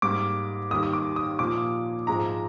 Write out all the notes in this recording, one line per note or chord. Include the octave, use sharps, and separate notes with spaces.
G#2 G3 A#3 D6
D#2 D#3 G3 A#3 D#6
D#6
D6
D#6
A#2 F3 A#3 D6
G#2 F3 G#3 A#5